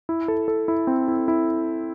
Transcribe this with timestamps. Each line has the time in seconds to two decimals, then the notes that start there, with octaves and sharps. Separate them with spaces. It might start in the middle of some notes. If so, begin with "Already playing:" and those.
0.09 E4
0.28 A4
0.48 A4
0.68 E4
0.87 C4
1.08 E4
1.28 E4